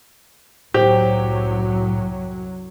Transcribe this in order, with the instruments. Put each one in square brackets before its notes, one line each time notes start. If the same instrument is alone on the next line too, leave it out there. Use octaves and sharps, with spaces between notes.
[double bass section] C2 F#2 F#3 [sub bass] A2 [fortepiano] G4 [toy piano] C5